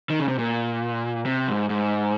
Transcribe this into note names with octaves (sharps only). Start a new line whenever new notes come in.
D#3
C#3
C3
A#2
C3
G#2
G#2